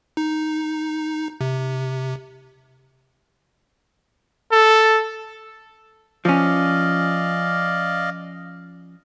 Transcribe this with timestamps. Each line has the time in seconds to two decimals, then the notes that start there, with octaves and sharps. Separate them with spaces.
0.17 D#4
1.41 C3
4.52 A4
6.25 F3 C#4 D5 D#5 F5